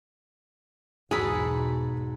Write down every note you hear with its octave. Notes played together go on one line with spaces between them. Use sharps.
B1 E2 G#2 B2 F#4 G#4 A4 B5